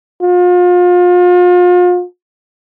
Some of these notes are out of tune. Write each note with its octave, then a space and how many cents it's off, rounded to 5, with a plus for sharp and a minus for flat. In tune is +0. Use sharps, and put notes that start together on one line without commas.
F4 +35